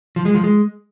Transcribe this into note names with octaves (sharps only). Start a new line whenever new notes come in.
F3
G#3
F3
G#3